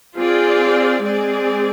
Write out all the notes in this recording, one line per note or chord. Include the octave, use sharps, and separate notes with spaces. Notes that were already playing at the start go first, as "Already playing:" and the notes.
C4 F4 G#4 D5
G#3 C4 G#4 D5